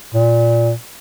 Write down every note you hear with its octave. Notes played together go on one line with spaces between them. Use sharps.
A#2